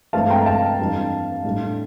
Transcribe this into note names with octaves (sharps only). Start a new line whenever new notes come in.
G2 E3 A3 C4 F5 A5
G5 A#5
F5 A5
F2 E3 G3 D4
A2 G3 D4